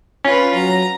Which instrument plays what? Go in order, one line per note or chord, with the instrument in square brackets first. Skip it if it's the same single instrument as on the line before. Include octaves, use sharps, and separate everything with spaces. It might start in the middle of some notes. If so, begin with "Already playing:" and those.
[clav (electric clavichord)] C#4 [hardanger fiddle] F4 B4
[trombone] F#3 [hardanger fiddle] A#5